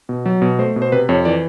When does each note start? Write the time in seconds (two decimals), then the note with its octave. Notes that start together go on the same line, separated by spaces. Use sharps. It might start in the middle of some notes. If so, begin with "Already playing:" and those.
0.09 B2
0.26 F#3
0.42 B2
0.59 A3 C5
0.76 B2
0.82 C5
0.92 C3 B4
1.09 F2 C#5
1.25 E3 D5